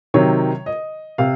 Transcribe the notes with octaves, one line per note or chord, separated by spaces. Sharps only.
C3 D#3 F#3 C#5
D#5
C3 F5